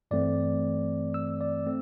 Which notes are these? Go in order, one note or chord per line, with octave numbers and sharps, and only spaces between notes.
G2 E3 A3 C4 D5
E6
D5
A3 C4